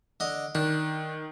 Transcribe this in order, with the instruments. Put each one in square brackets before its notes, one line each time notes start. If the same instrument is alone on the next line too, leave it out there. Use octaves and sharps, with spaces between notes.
[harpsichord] D3 D#5
[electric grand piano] D#3 [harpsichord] D4